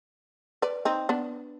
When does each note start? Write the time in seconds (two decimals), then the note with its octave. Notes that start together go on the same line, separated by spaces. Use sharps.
0.62 B4 D5
0.85 C4 D#4
1.09 B3 D4